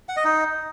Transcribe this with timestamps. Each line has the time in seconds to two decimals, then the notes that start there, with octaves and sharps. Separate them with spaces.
0.09 F#5
0.17 D#5
0.25 D#4